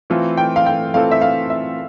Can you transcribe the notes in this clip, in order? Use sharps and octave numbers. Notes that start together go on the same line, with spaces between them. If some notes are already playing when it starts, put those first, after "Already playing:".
E3 A3 C4 F4 A4
G5
F5
G5
E3 A3 C4 F4 A4 F5
E5
F5
E5